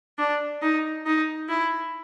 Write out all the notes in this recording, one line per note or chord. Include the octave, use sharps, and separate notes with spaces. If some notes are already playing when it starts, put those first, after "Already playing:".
D4
D#4
D#4
E4